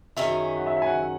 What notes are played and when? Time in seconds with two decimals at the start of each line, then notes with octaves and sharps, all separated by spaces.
0.16 F#2 D#3 F#3 C#4 G#4 E5
0.57 F#5
0.67 E5
0.77 E5
0.82 G#5
0.86 F#5